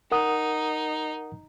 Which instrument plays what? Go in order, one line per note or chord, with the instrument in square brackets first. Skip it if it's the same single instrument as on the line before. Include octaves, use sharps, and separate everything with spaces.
[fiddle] D#4 [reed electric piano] A#4 F#5 D#6